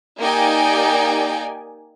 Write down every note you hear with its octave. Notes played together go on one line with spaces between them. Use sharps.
A#3 D#4 G4 D5 G5 G#5